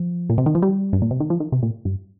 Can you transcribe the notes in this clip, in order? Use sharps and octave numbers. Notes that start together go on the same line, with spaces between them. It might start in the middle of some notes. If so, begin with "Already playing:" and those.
Already playing: F3
A#2
C3
D#3
F3
G3
G2
A#2
C3
D#3
F3
D#3
C3
A#2
G2